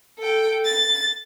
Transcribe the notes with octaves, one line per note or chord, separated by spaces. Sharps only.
A4 G5
A6